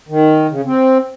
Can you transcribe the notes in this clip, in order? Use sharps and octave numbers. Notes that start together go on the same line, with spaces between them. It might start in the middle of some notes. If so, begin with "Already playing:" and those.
D#3
C#3
C4